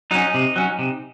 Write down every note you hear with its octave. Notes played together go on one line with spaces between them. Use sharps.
F#3 C#4 D#4
C3
F#3 C#4
C3